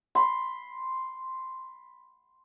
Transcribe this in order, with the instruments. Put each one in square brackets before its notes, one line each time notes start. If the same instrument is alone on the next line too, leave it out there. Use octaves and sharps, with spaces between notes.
[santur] B5 C6